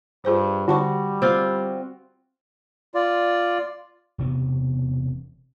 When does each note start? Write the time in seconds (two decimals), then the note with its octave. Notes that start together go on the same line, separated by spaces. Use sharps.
0.25 G2 F4 G#4 C5
0.68 D3 G3 F#4 A5 C#6
1.22 C4 F4
2.94 F4 D5
4.18 E1 C3 B3